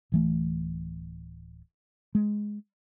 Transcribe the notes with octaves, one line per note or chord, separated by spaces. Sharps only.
D1 E3 A3
G#3